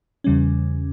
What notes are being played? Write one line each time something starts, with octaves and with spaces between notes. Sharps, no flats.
E2 C#3 G3 C#4